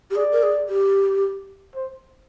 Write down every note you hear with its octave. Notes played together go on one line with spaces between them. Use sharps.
G4
G#4 D5
A#4
G#4
G4
C5